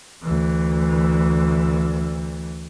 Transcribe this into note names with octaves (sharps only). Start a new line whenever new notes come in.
D2 E3